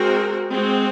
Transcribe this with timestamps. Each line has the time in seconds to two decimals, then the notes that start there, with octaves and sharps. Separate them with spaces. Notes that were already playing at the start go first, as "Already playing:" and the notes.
Already playing: G#3 C4 F#4 A#4
0.52 G#3 C4 F#4